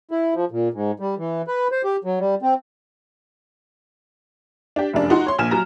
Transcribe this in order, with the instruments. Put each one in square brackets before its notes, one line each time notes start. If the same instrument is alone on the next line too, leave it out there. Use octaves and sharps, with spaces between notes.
[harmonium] E4
F3
A#2
G#2
G3
E3
B4
C5
G4
F#3
G3
C4
[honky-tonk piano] D4 G4
F1 F#2 D4
D#4 F#4 C6
C#5 C6
A#1 G#5 F6 E7
F#3 A#5